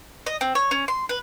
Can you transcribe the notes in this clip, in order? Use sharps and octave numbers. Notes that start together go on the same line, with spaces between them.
D#5
C4
C#5
C#4
C6
B4